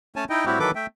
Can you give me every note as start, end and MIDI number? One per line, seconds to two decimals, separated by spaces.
0.16 0.24 57
0.16 0.24 61
0.16 0.24 73
0.16 0.24 80
0.16 0.24 81
0.30 0.45 63
0.30 0.45 64
0.30 0.45 75
0.30 0.45 79
0.46 0.59 45
0.46 0.59 55
0.46 0.59 60
0.46 0.59 64
0.46 0.59 66
0.46 0.59 67
0.59 0.71 51
0.59 0.71 52
0.59 0.71 54
0.59 0.71 69
0.59 0.71 71
0.59 0.71 86
0.75 0.86 57
0.75 0.86 76
0.75 0.86 79